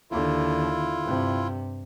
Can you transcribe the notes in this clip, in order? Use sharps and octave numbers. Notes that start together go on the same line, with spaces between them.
D#2 D3 E4 F4
G2 C3